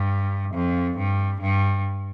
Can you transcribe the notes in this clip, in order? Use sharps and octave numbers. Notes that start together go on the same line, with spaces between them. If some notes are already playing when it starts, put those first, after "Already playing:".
Already playing: G2
F2
G2
G2